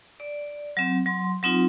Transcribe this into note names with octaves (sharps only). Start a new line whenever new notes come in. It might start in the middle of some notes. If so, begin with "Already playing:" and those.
D5
F#3 C4
F#3 C6
F#3 C4 D#4 F4